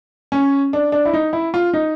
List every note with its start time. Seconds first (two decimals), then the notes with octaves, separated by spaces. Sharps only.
0.32 C#4
0.73 D4
0.92 D4
1.05 E4
1.14 D#4
1.33 E4
1.54 F4
1.73 D#4